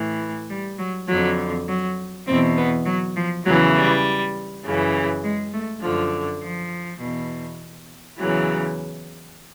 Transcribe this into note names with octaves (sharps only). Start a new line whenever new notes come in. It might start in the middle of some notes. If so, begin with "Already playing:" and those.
Already playing: A2 E3
G3
F#3
F2 D3 F#3
F#3
E2 B2 C4
B3
F#3
F3
E2 C#3 E3 F#3
G3
F#2 C#3 E3
G#3
A3
F#2 D3 F3
F3
E2 B2
E2 C#3 E3 F#3